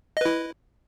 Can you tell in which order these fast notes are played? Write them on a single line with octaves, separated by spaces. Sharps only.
D#5 B4 E4